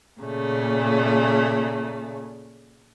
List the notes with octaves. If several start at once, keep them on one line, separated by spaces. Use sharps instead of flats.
A#2 C#3 A3